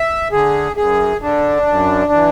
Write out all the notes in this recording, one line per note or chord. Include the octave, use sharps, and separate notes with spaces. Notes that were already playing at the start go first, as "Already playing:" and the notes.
Already playing: E5
D3 G#4
F#2 G#4
D3 D4
F#2
E3